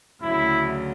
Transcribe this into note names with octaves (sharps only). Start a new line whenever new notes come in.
D2 C#3 F#3 E4